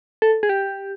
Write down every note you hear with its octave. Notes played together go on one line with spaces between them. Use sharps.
A4
G#4
G4